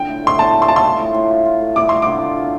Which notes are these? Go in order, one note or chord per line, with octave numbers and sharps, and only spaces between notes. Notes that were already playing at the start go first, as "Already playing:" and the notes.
Already playing: D3 F4 G5
A2
A2 C6
A2 A5
G3
C6
F4 A5
C6
A2
A2
A2
F4
F4
A3
G3 D6
G3 C6
D3 D6
F4
F4